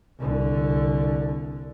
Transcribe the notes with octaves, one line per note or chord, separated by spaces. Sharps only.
C2 D3